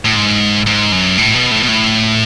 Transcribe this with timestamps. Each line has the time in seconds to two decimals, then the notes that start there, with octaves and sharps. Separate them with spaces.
0.05 A2
0.15 G#2
0.67 G#2
0.92 F#2
1.18 A2
1.34 B2
1.51 A2
1.63 B2
1.68 A2